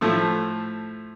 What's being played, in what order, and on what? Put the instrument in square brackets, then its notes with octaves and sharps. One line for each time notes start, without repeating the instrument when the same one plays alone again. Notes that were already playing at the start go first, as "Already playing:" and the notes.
[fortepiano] A2 F3 A3